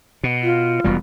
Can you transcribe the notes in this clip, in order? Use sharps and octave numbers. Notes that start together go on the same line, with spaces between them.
B2
F4
E1 B2 G3